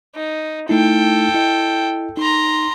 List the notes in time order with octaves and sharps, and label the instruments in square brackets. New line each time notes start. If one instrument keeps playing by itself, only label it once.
[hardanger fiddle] D#4
[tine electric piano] A3 D#4 E4 [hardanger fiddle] A4 G5
[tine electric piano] E4 D#5
[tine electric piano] D#4 [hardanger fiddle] A#5 C6